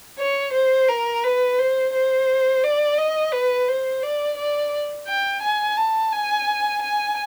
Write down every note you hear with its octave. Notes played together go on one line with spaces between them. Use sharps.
C#5
C5
A#4
B4
C5
C5
D5
D#5
B4
C5
D5
D5
G5
G#5
A5
G#5
G#5